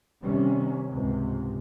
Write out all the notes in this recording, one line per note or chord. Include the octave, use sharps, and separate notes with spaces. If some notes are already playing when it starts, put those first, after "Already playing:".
C3 D#3 G3 C#4
C#2 G#2 C3